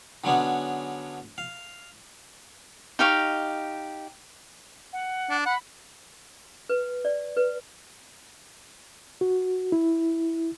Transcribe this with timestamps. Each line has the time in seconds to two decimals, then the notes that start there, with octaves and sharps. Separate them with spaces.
0.24 D3 F#3 G#3 B3 C#4 D4
1.38 F5
2.99 D#4 G4 F5 C#6
4.93 F#5
5.30 D4
5.46 F#5 B5
6.69 B4
7.05 D5
7.37 B4
9.21 F#4
9.72 E4